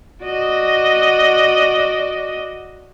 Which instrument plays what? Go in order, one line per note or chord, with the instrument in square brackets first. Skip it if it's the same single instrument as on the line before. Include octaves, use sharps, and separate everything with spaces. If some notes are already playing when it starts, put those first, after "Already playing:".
[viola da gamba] F#4 D5 D#5